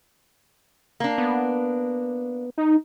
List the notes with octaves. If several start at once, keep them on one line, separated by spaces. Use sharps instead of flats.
A#3 D4
B3
D#4